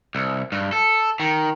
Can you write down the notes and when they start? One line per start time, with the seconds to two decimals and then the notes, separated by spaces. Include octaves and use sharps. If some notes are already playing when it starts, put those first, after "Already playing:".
0.15 C2
0.52 G2
0.72 A4
1.20 D#3